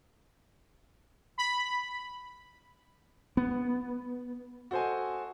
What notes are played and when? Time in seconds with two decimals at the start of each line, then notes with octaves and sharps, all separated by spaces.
1.38 B5
3.37 B3
4.71 F#4 A4 C5 D#5 G#5